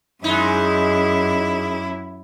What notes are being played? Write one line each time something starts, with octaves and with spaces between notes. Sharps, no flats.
F#2 G#3 D#4 E4